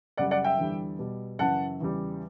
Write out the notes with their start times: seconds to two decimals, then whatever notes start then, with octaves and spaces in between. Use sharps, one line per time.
0.17 F#2 C#3 G3 D5 F#5
0.31 D5 F#5
0.44 E5 G5
0.58 E2 D3 G3
0.99 B2 G3
1.39 F#2 C#3 E3 F#5 A5
1.80 E2 C#3 G3